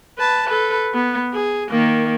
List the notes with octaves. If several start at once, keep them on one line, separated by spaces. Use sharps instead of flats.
B4 A5
A4 B4
B3
G#4
D#3 A#3